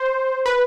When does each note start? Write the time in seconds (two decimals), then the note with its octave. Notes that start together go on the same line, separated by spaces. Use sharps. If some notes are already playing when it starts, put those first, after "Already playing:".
Already playing: C5
0.46 B4